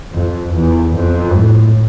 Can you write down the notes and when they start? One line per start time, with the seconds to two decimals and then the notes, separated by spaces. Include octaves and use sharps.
0.14 F2
0.55 E2
0.96 F2
1.35 A2